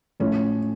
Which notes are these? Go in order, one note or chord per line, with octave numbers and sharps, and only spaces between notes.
A2 F3 A3 C#4